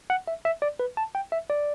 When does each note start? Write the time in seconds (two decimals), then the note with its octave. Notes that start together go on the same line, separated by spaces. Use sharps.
0.10 F#5
0.28 E5
0.45 E5
0.62 D5
0.80 B4
0.97 A5
1.15 G5
1.32 E5
1.50 D5